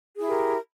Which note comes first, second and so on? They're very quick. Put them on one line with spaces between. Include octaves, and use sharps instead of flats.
G#4 E4 G4 A#4